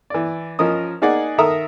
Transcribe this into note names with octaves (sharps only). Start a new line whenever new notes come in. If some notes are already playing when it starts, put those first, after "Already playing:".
E3 D5
F3 C#4 A#4 D#5 D#6
A#3 D#4 G#4 D5 F#5
D#3 A4 A#4 E5 A#5 D#6